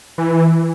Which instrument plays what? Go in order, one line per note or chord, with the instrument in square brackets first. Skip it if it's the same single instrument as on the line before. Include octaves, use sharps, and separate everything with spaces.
[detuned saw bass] E3